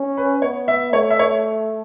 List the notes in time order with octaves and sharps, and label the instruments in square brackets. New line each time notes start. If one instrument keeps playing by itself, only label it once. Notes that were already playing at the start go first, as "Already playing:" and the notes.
Already playing: [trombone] C#4
[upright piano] B4
[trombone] B3 [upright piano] C#5
[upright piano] E5
[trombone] A3 [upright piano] C#5
[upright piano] E5
C#5